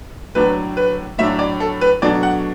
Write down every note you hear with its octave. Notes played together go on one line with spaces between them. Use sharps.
A2 F#3 D4 B4
B4
A2 F#3 D4 E5
D5
A4
B4
B2 F#3 A3 D4 D5
F#5